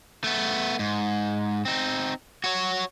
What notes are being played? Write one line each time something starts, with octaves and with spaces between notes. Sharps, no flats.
A3 B3
G#2
C4 D#4
F#4 C#5